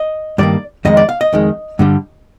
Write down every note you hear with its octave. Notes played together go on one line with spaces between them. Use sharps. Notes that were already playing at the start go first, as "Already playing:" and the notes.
Already playing: D#5
G2 D#3 A#3 D5
F2 D#3 G#3 D#5
D5
F5
D#5
F2 D#3 G#3
G2 D3 G3